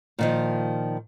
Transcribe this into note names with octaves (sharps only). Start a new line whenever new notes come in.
A#2 D#3 F3